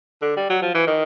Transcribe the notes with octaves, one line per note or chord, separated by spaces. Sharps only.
D3
G3
F#3
F3
E3
D#3